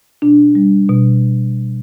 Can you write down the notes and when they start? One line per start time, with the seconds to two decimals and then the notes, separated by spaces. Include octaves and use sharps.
0.22 B2 D4
0.55 G3
0.89 B2